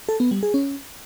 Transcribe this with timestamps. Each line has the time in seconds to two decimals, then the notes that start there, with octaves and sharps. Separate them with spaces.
0.09 A4
0.20 B3
0.31 G3
0.43 G#4
0.54 C#4